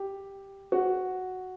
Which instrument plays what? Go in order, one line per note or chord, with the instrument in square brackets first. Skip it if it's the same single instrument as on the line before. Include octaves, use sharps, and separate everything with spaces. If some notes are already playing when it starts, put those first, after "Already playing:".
Already playing: [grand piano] G4
F#4